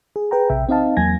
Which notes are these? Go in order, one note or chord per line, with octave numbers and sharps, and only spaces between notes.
G#4
G#4 B4 G5 A#5
A#1 C3 E5 G5
C4 D#4 D#5 F5 A5
E2 F#3 A#3 G#5 G#6 A#6